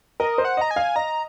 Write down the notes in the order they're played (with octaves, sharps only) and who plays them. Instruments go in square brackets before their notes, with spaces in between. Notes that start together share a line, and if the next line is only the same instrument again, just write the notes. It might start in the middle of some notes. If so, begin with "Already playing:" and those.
[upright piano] A#4 [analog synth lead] D#5
[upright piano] C5
[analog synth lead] F#5
[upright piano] D#5 [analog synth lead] A#5
[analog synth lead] G#5
[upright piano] F5
[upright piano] D#5 [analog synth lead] A#5